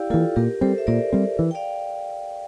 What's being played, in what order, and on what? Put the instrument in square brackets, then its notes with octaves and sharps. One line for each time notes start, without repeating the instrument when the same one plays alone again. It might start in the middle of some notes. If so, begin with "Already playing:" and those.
Already playing: [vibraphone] E4 G4 D5 F5 G5
[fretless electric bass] A#3 [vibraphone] F4 A4
[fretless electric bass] E3
[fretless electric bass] A#2 [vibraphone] G4 A#4
[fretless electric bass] G3 C4 [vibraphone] A4 C5
[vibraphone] E5
[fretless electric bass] A#2 [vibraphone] A#4 D5
[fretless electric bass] G3 C4
E3
[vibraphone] G5
D5 F5